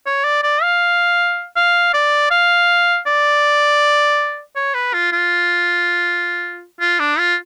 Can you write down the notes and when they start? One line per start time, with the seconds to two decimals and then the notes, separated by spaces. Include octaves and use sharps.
0.06 C#5
0.24 D5
0.43 D5
0.62 F5
1.56 F5
1.94 D5
2.31 F5
3.06 D5
4.56 C#5
4.74 B4
4.94 F4
5.12 F4
6.81 F4
6.99 D4
7.19 F4